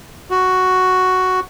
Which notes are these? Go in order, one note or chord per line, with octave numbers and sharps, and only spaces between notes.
F#4